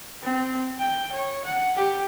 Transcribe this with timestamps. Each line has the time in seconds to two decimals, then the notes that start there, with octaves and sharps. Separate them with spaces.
0.23 C4
0.79 G5
1.12 C#5
1.45 F#5
1.76 G4